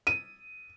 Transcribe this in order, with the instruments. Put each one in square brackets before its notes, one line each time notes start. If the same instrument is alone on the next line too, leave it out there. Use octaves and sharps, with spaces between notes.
[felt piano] D#7